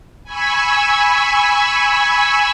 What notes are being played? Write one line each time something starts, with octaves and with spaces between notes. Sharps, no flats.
G#5 B5 C#6 E6